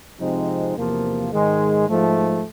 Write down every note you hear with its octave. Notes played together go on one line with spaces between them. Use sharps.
C3 F3 G#3 C4 D#4
E2 C3 F3 A#3
G#2 D#3 G#3
G#2 F3 A3